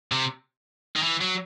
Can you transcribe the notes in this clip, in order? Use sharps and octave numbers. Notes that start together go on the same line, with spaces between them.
C3
D#3
E3
F#3